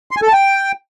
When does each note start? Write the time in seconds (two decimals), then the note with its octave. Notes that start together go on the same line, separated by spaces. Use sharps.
0.11 C6
0.17 G#5
0.22 A4
0.27 A5
0.33 G5